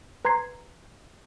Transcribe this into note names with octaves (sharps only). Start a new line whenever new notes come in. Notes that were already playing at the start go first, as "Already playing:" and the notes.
B4 A#5 C6 G#6 C7